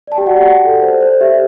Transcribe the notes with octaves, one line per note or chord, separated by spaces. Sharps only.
D5 A5
G4 G5
F#4 D5 F#5
D5
F#4
A4
C5
C5
G4 E5